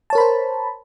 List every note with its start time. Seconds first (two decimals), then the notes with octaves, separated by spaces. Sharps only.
0.10 A5
0.13 C#5
0.15 A#4
0.18 B5
0.20 C5